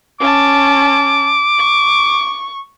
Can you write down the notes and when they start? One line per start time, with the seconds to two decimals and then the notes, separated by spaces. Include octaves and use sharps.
0.20 C#4 A5 D6
1.58 C#6